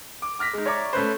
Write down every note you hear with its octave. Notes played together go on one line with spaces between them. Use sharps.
D6
D6 F6 A#6 B6
G#3 D#4
C#5 D5 E5 A#5 C#6 D6
A3 C#4 B4 C5